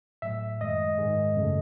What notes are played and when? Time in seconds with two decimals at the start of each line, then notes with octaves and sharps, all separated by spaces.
0.22 A2 F#3 A3 E5
0.61 F#2 D#3 G#3 D#5
0.98 G#2 D#3 G#3
1.36 F#2 C#3 F#3 A3